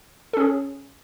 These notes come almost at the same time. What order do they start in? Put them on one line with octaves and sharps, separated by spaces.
A4 C#4 G#4